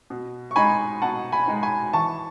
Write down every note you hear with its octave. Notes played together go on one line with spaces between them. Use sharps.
B2
C#6
G#3 D#4 G#5 B5
B2 F#5 A5
G#5 B5
G#3 D#4
G#5 B5
E3 A5 C#6